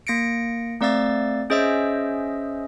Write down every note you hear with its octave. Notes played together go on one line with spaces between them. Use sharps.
A#3 A#6 C#7 D7
A3 C4 D5 F5 E6 A6
C#4 G#4 C5 D#5 E5 E6